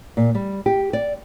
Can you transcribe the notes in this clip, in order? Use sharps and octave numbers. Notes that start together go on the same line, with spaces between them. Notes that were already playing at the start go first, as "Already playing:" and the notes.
A#2
G3
G4
D5